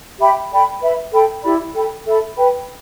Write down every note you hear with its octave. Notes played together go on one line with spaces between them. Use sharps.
G4 E5 G5 B5
A4 D5 G5 B5
B4 E5 B5
A4 G5 B5
E4 G4 D5 B5
A4 G5 B5
A4 E5 B5
B4 G5 B5